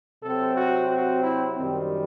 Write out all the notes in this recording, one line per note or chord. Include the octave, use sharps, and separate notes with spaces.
C3 F#3 C4 A4
F#4
F#4
E4
F#2 D#3 G3 C4